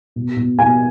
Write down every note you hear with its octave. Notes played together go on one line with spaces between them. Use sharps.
B2
B2
B2 G#5